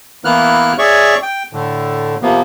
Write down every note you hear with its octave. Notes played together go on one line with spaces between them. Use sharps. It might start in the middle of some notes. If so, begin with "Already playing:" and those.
E3 A#3 B3 E4 F6 F#6
G#4 C#5 D5 E5 C#6
G5
A2 D3
C3 F3 A#3 B3